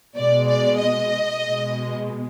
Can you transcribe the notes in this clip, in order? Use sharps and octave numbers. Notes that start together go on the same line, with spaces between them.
B2 G#3 D5
D5
D#5
B2 G#3